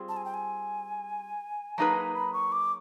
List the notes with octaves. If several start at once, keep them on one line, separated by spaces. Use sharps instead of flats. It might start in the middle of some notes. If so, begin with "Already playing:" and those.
Already playing: G3 C4 F4 G#4
A5
G#5
G5
G#5
F#3 A#3 D#4 G#4 B4 A5
A#5
B5
C#6
D6